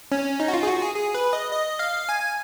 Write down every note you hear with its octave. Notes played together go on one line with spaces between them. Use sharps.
C#4
D#4
F#4
F4
G#4
F#4
G#4
G#4
B4
D#5
D#5
F5
G#5